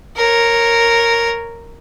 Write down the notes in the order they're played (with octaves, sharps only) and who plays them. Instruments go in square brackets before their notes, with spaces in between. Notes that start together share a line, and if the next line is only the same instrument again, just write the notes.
[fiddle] A#4 C#5